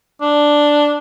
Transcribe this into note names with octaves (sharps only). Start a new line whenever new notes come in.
D4